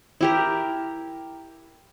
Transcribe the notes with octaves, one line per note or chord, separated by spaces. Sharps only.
E4 G4 A#4